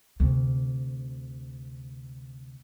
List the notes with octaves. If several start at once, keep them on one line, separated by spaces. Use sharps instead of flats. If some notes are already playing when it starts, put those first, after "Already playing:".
D2 C3